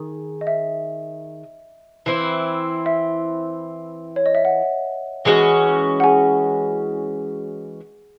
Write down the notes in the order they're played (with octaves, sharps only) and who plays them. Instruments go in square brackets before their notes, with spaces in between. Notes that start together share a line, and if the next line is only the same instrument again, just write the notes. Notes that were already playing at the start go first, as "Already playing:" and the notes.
Already playing: [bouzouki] D#3 G#4
[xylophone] D#5
E5
[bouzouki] E3 C4 E4
[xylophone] E5
C#5
D#5
E5
F#5
[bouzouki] E3 G#3 C#4 F#4
[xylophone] F#5
G#4 G#5